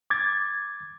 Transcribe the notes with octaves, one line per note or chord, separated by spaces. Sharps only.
D6 G#6 A6